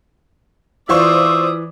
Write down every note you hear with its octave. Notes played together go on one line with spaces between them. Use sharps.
E3 F4 C5 D5 E5 C#6 D#6